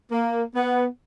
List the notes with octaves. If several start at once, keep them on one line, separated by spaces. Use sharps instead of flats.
A#3
B3